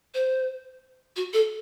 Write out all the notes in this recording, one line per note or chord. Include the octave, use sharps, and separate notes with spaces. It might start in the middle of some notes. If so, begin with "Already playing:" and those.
C5
F#4
A4